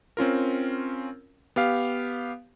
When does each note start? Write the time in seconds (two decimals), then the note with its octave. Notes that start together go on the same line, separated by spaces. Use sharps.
0.17 C4 C#4 F4 A#4
1.56 B3 G4 F5